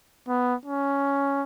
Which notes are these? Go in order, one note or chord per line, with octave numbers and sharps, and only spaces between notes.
B3
C#4